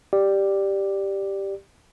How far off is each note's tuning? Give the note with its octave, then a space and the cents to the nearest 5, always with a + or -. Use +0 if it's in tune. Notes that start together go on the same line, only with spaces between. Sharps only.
G4 +0 D5 +5